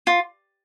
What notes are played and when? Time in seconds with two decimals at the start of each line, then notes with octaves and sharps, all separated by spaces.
0.07 F4